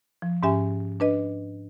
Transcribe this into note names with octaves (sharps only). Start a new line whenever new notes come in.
F3
G#2 C#4 G4 E5 G#5
D4 B4 D#5